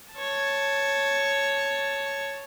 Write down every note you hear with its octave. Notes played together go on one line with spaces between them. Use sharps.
C#5 A5